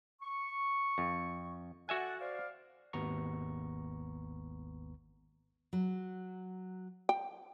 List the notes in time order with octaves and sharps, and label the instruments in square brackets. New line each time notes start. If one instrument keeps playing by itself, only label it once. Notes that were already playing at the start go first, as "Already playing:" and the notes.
[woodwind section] C#6
[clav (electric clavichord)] F2
[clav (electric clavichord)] F#4 E5 G#5 [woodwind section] A4 D5 F#5
[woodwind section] C5 D5 F5
[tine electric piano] G#1 D#2 B3 A#5 C#6
[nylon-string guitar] F#3
[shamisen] G5